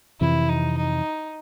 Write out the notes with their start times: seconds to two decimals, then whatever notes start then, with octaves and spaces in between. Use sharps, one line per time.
0.20 F2 C3 E3 E4
0.49 D#4
0.77 D#4